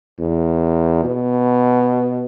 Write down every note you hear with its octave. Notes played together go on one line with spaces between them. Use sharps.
E2
B2